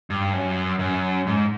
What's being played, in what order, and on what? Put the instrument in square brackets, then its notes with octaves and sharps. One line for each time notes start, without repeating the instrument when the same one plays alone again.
[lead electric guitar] G2
F#2
F#2
G#2